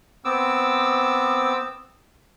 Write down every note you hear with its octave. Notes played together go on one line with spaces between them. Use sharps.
B3 C4 D6 E6